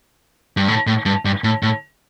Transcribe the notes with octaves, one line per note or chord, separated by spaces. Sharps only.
G2
A2
A2
G2
G2
A2
A2